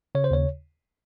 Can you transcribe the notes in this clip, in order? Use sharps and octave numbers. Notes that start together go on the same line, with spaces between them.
C#3 C#5
C5
D#2 C#5